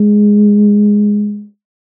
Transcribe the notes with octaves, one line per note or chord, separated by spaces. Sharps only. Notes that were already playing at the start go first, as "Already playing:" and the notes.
Already playing: G#3